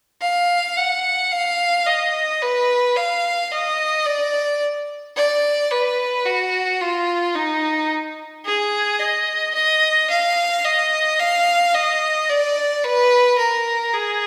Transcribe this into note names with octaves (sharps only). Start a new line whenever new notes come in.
F5
F#5
F5
D#5
B4
F5
D#5
D5
D5
B4
F#4
F4
D#4
G#4
D#5
D#5
F5
D#5
F5
D#5
D5
B4
A#4
G#4